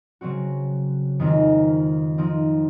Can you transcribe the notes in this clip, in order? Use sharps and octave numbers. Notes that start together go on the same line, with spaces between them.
C#3 F#3 C4 F#4
F2 D#3 G#3 C4 D#4
F3 C4 D#4